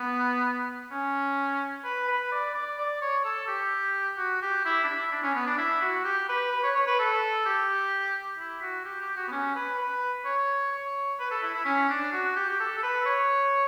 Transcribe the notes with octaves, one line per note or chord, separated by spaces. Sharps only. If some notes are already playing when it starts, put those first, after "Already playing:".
Already playing: B3
C#4
B4
B4
D5
D5
D5
C#5
A4
G4
F#4
G4
E4
D4
E4
D4
C#4
B3
D4
E4
F#4
G4
B4
B4
C#5
C#5
B4
A4
G4
E4
F#4
G4
G4
F#4
B3
C#4
B4
B4
C#5
C#5
B4
A4
E4
E4
C#4
D4
F#4
G4
G4
A4
A4
B4
C#5